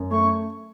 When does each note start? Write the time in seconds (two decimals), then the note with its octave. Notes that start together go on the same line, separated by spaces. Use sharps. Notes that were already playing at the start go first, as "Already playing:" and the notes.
Already playing: F#2
0.11 A3 C#6